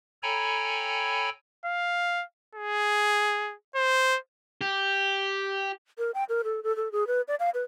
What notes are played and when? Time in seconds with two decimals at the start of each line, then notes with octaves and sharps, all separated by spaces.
0.23 A4 C#5 G5 G#5 A#5 B5
1.66 F5
2.55 G#4
3.76 C5
4.61 G4
5.98 A#4
6.14 G5
6.29 A#4
6.44 A4
6.63 A4
6.76 A4
6.92 G#4
7.07 B4
7.28 D5
7.40 F5
7.54 B4